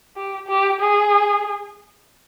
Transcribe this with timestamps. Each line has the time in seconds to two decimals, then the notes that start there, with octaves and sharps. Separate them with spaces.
0.16 G4
0.48 G4
0.80 G#4